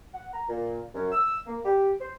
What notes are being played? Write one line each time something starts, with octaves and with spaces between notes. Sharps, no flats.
F#5
A#5
A#2
F#2
E6
A#3
G4
C5